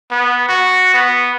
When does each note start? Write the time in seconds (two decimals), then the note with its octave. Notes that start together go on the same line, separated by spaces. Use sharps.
0.11 B3
0.49 F#4
0.94 B3